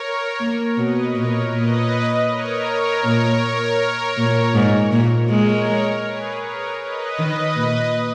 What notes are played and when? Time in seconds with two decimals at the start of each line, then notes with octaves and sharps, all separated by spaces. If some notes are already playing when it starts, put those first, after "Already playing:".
Already playing: A#4 C#5
0.40 A#3
0.77 B2 B4 D#5
1.15 A#2 A#4 C#5
1.53 A#2 B4 D#5
2.29 A#4 C#5
3.04 A#2
4.17 A#2
4.55 G#2
4.92 A#2
5.30 G#3 A#4 C#5
6.06 G#4 B4
6.44 A#4 C#5
6.81 B4 D#5
7.19 D#3
7.56 A#2